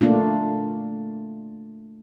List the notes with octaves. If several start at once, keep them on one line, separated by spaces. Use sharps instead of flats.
A3 A#3 D4 F4